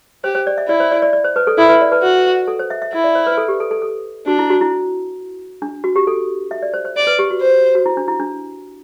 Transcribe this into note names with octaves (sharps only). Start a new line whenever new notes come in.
G4 C5
C5
D5
E5
E4 D5
C5
D5
D5
D5
C5
B4
A4
E4 A4
B4
D5
B4
F#4
A4
C5
E5
E5
E4 E5
D5
C5
B4
A4
G4
A4
A4
A4
D4 F#4
E4
F#4
E4
D4
F#4
G4
A4
E5
D5
C5
C5
D5
B4
G4
F#4
C5
F#4
E4
D4
E4
D4